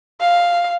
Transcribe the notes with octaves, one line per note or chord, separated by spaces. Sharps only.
F5